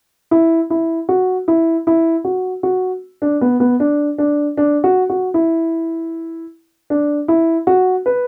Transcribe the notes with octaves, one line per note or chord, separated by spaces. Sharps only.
E4
E4
F#4
E4
E4
F#4
F#4
D4
B3
B3
D4
D4
D4
F#4
F#4
E4
D4
E4
F#4
B4